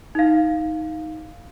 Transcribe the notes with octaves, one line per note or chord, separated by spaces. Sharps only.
D#4 F5